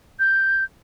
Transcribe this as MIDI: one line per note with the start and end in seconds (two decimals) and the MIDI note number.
0.19 0.64 91